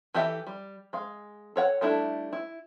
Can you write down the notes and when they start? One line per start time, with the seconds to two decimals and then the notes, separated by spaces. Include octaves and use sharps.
0.14 E3 G4 A4 E5
0.47 G3
0.93 G#3 F5
1.56 A4 C#5 F#5
1.81 G3 A3 D4 E4
2.33 E4